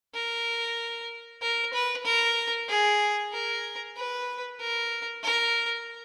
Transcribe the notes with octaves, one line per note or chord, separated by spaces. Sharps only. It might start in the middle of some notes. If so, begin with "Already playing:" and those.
A#4
A#4
B4
A#4
G#4
A#4
B4
A#4
A#4